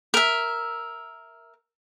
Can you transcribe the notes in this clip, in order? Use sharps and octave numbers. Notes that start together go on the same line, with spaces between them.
A#4 E5